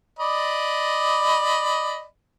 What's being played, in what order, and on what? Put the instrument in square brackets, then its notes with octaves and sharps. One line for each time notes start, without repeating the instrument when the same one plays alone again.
[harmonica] D5 D#5 B5